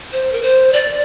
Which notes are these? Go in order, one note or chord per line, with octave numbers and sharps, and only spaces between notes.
C5
A#4
C5
D5